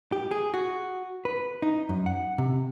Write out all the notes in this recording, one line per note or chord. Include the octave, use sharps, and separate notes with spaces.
G4
G#4
F#4
B4
D#4
F#2
F#5
C3